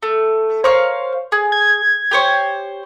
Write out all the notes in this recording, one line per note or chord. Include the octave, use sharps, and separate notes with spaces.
A3
A#4 C5 C#5 F5
G#4
G#6
G4 C5 C#5